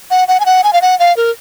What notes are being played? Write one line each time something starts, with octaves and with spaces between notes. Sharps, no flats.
F#5
F#5
G#5
F#5
G#5
F5
F#5
F5
A#4